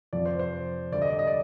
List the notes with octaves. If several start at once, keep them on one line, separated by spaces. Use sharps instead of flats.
F2 C3 F3 D5
C5
C5
D2 D3 G3 D5
D#5
D5
D#5
D5